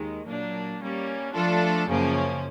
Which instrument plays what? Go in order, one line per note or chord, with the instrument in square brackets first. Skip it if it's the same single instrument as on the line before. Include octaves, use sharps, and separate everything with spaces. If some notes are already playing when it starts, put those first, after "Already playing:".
Already playing: [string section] D#2 D#3 G#3
A#2 F#3 A#3 D4
G3 A#3 C#4
F3 A3 D4 F4 A4
F#2 C#3 F3 A#3 C#4